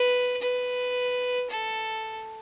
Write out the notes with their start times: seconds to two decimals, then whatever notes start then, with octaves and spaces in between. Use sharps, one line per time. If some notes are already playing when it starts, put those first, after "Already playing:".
Already playing: B4
0.42 B4
1.51 A4